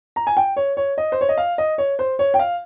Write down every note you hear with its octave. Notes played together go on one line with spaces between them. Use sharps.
A#5
G#5
G5
C#5
C#5
D#5
C5
C#5
D#5
F5
D#5
C#5
C5
C#5
G5
F5